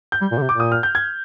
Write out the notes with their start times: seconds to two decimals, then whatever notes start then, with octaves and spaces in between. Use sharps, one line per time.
0.12 G6
0.21 G3
0.32 A#2
0.38 D3
0.42 C3
0.49 A#2 D6
0.60 D#6
0.72 F6
0.83 G6
0.95 G#6